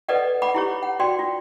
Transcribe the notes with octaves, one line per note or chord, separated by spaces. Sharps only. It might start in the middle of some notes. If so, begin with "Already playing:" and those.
A4 B4 D5 D#5 F#5
F#5 B5 D6
E4 G4 C#5
F#5
F#4 D5 G5 C6
F4